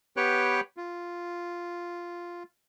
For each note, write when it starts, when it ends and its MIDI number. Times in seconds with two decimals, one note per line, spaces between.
0.17 0.61 59
0.17 0.61 67
0.17 0.61 71
0.17 0.61 73
0.17 0.61 79
0.17 0.61 90
0.77 2.43 65